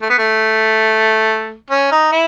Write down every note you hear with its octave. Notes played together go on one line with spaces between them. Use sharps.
A3
B3
A3
C#4
D#4
E4